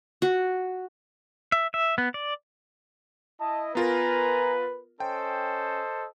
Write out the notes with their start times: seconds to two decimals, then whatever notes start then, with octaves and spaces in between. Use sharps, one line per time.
0.22 F#4
1.52 E5
1.74 E5
1.98 B3
2.14 D5
3.40 E4 D#5 A5
3.75 B3 F4 A#4 B4 G#5 A#5
5.00 C#4 A4 C5 D#5 G5